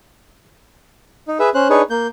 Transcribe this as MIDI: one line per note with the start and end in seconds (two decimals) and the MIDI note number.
1.28 1.38 63
1.39 1.50 68
1.39 1.50 71
1.39 1.50 76
1.54 1.68 61
1.54 1.68 72
1.54 1.68 90
1.70 1.82 62
1.70 1.82 63
1.70 1.82 68
1.70 1.82 71
1.70 1.82 73
1.90 2.07 58
1.90 2.07 91